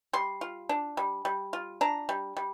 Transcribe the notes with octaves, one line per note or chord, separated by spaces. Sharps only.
G3 C6
F4
D4
G3
G3
F4
D4 A#5
G3
G3